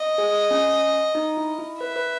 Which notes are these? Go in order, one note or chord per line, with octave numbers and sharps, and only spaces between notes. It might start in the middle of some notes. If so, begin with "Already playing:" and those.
Already playing: D#5
G#4
C#4
D#4
E4
E4
B4 E5
B4